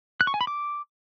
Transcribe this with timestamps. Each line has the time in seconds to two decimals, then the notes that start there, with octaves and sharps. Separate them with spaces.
0.21 F#6
0.27 C#6
0.34 G#5
0.41 B5
0.47 D6